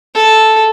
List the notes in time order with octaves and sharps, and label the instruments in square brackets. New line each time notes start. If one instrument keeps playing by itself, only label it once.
[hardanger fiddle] A4